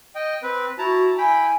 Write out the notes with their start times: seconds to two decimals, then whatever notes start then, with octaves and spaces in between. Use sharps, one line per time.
0.15 D#5 G5
0.43 C4 B4
0.79 E4 F#4 A5 A#5
1.18 E4 G5 G#5 B5